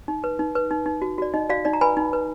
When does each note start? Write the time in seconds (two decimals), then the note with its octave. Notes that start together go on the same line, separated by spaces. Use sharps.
0.08 D#4
0.24 B4
0.39 D#4
0.55 B4
0.71 D#4
0.86 D#4
1.02 F#4
1.18 F#4 D5
1.34 D#4 D#5
1.49 F#4 D5 F5
1.65 D#4 D5
1.73 A#5
1.81 B4 G#5 B5
1.97 D#4
2.13 B4